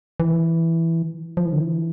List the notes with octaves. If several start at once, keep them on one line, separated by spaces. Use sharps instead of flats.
E3
F3
E3
D3
E3